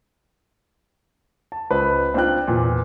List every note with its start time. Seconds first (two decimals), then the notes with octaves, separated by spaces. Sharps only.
1.52 A5
1.71 C#2 B4 C5
2.14 C4 D4 D#4 F4 G5 F#6
2.47 E2 A#2